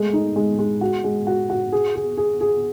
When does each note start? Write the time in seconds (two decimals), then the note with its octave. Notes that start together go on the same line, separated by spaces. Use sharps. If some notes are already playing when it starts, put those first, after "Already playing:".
Already playing: G#3 A3
0.13 D#4
0.36 G#3
0.59 G#3
0.81 F#4
1.04 G#3
1.27 F#4
1.50 F#4
1.72 G#4
1.95 G#4
2.17 G#4
2.41 G#4